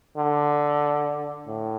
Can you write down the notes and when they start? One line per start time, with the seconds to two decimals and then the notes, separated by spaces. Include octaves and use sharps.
0.17 D3
1.47 A2